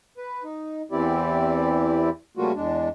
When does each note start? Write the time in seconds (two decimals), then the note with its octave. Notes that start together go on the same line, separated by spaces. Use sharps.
0.18 B4
0.44 D#4
0.92 E2 E3 C4 E4 G4 D5
2.37 C#3 G3 A3 A#3 F4 F#4
2.55 E2 G#3 D4